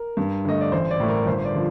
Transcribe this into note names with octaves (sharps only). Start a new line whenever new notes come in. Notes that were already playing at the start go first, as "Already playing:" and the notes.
Already playing: A#4
G2
D3 A3 D#5
D5
A1 C5
D5
A2 A3
A#4
G1 C5
D5
D3 F3